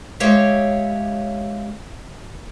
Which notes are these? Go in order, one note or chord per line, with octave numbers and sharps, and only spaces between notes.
G#3 G4 C#5 E5 F5